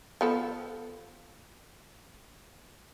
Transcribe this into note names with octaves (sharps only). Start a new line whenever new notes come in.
F3 B3 A4